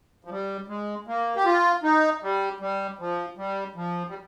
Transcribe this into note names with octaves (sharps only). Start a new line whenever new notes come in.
F3
G3
G#3
A#3
G4
F4
D#4
G3
G3
F3
G3
F3
G3